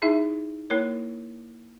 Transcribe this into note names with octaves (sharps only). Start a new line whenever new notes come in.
D#4 E4 G#4 E5
A#3 E4 A#4 C#5